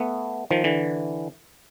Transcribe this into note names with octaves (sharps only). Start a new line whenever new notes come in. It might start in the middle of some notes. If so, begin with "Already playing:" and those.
Already playing: A3 B3
D#3 F3
D3 E3